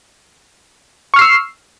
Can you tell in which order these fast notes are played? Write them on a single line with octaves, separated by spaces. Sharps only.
C#6 F6 C7 E6